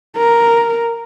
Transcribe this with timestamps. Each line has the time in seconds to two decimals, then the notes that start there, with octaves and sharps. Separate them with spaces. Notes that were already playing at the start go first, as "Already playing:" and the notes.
0.16 A#4